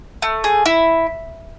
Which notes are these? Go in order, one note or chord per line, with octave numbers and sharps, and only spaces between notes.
A3
G#4
E4